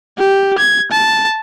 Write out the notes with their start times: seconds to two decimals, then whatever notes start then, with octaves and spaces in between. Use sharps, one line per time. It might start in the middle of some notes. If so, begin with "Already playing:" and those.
0.18 G4
0.59 G#6
0.92 A5